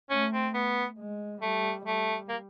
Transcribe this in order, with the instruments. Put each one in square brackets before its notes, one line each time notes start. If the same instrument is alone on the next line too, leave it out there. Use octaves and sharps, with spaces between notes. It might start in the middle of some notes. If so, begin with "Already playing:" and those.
[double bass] A3 [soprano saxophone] C#4
[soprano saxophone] C4
B3
[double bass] G#3
[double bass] G3 [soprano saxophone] A3
[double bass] G3 [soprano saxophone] A3
[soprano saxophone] A#3